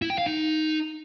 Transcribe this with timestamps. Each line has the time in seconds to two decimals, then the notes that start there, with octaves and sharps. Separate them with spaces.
0.02 E4
0.10 G5
0.18 F5
0.26 D#4